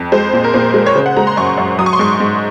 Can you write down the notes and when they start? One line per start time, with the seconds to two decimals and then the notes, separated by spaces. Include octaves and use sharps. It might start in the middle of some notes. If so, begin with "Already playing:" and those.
Already playing: F2
0.12 G#3 C5
0.33 A#2
0.44 A#4
0.54 A#2 C5
0.74 G#3
0.86 C#5
0.95 C#3 C5
1.06 F#5
1.16 G#3 A#5
1.27 C6
1.37 F#2 C#6
1.57 F#2
1.79 F#3 D#6
1.86 C#6
1.93 C6
1.99 G#2 C#6
2.20 G#2